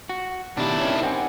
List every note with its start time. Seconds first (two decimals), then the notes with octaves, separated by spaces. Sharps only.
0.09 F#4
0.57 B2 D#3 D4 E4 G4
0.81 D#3 C#4 D6
1.03 C4 F#5 G#5